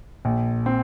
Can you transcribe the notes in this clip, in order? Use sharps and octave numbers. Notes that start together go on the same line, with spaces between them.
A#1
C4